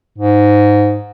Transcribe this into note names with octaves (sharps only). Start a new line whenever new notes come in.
G#2